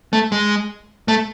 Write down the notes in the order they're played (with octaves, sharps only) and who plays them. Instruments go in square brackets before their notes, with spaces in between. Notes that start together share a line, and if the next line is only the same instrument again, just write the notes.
[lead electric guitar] A3
G#3
A3